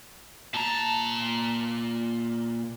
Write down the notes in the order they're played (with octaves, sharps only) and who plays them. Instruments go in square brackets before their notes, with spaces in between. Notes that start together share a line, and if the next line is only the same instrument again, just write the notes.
[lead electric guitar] A#2 A#5 [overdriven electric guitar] A5